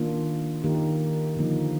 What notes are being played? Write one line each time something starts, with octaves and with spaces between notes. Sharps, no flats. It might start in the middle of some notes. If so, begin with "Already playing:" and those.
Already playing: D#3 A#3 D4 F4
D#3 A#3 D#4 G4 A#4
D3 F3 A#3 D#4